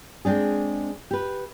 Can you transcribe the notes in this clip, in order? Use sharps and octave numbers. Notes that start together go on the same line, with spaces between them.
G#3 C4 D4 G#4
G4 B4